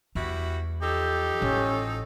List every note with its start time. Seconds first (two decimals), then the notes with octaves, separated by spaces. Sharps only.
0.15 E2 G3 E4 F#4
0.82 F3 D#4 G4 A4
1.42 A1 C#4